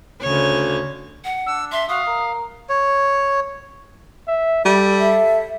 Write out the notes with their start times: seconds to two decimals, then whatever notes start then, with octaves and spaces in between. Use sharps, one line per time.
0.22 D2 C#3 C#5
1.24 F#5
1.46 D4 E6
1.72 E5 C6
1.89 F#4 F5 D#6
2.07 A#4
2.69 C#5
4.28 E5
4.65 G3 A4 D5
5.00 E5